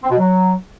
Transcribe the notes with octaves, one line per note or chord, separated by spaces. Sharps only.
C4
B2
F#3